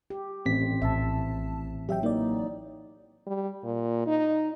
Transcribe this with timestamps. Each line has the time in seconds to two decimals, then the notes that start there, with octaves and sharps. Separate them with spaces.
0.10 G4
0.45 A1 C4 B6
0.82 A#1 A2 E5 A5
1.89 E3 F#3 G4 E5 G5
2.03 A#3 D#4 D5
3.27 G3
3.64 A#2
4.07 D#4